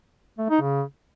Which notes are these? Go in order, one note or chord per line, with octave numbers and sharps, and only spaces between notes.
A3
D#4
C#3